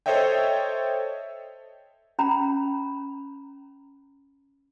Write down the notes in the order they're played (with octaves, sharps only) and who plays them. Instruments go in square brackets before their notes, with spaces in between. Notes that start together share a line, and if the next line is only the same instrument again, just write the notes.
[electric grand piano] A4 C5 C#5 D#5 E5 G5
[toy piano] C#4 A#5 B5